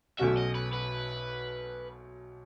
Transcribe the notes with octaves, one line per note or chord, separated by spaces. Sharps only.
B1 B2 A3 C#4 F#4 E5
D#5
B4
B4